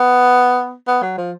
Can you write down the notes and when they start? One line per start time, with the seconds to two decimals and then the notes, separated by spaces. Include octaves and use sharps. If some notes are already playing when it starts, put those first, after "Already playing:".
Already playing: B3
0.87 B3
1.02 F#3
1.18 F3